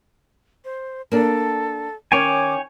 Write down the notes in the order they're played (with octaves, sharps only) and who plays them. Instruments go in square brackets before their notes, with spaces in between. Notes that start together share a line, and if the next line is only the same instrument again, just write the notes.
[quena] C5
[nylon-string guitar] A#3 D4 [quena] A4
[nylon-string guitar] D#3 C#4 [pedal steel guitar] C#5 G5 G#5 [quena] D6